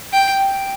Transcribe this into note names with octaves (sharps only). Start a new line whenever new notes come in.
G5